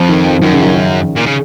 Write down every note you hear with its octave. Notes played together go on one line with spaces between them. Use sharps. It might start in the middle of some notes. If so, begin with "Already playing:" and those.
Already playing: F2 F3
D#3
F3
F#2 D#3
C#3
D#3
D#3
A#2
C#3